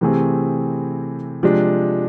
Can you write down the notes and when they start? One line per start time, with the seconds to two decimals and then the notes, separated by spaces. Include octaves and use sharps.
0.01 C3 E3 A3 C4 G#4
1.43 C3 F3 G#3 D4